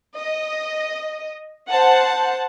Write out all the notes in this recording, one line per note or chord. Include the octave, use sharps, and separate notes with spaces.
D#5
C5 F#5 A5